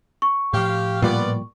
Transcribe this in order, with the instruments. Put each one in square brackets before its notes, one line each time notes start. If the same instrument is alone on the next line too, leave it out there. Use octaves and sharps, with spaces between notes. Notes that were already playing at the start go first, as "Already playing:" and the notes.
[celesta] C#6
[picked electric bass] A2 F3 [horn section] G4 F5
[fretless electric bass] A#2 G3 [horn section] B3 F4 D5